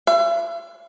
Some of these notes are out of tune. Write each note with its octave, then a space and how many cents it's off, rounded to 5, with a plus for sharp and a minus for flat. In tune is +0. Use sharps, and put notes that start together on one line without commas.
E5 +40